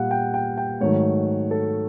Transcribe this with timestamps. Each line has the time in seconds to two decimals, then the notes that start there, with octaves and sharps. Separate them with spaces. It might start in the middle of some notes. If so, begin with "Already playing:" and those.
Already playing: A#2 G3 F5 F#5
0.11 G5
0.34 G5
0.58 G5
0.80 G#2 D#3 F#3 A3 C#5
1.51 A4